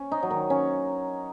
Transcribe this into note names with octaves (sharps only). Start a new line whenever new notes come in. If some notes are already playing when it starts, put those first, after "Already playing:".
Already playing: C#4
D#4
F#3
D#3
C#4